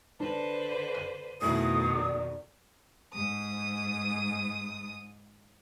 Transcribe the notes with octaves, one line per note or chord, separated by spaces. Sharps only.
D3 D4 B4 C5
D#7
F2 B2 D#3 A3 E4 D#6
D5
G#2 D#6